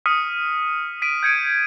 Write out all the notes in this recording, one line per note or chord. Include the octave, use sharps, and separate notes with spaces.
D#6 F6 B6 C#7 D#7
B6 D7 D#7
G6 G#6 C#7 D7